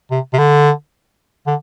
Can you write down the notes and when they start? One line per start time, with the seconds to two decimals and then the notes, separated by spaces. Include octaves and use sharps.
0.11 C3
0.34 C3
0.38 D3
1.47 D3